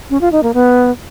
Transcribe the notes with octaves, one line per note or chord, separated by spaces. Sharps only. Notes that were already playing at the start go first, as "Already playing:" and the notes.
C#4
F4
D#4
A#3
B3